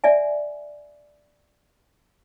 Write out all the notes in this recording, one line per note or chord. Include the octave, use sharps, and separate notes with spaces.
D5 E5 G#5